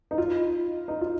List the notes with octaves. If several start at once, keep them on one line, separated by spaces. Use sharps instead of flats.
D#4
F4
D#4
F4